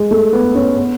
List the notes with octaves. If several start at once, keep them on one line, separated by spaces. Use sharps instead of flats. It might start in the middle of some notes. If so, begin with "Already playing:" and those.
Already playing: G#3
A3
B3
C#4
B3